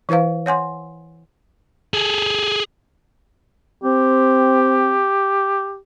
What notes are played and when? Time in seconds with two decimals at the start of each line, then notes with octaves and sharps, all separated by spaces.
0.09 E3 E4 B4 C5 F5
0.46 C#5 F#5 G#5 C6
1.94 G#4 A4
3.83 C4 G4